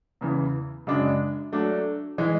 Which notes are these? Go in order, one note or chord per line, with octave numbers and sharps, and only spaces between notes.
E2 C#3 E3
F#2 C#3 G#3 D4
F#3 A3 D4
E3 G#3